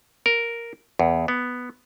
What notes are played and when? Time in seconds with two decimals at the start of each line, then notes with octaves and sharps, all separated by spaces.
0.26 A#4
0.99 E2
1.28 B3